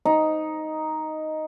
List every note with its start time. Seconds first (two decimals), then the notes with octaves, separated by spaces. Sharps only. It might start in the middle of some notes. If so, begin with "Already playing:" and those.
0.05 D#4